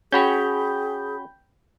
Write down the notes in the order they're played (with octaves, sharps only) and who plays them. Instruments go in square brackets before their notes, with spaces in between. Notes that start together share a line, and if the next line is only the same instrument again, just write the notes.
[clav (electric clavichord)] C#4 F#4 C#5 [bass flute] G#4 [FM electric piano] G5 B5 G6